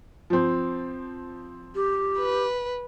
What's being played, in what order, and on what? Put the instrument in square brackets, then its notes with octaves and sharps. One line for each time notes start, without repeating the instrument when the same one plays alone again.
[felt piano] F3 C4
[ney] G4
[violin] B4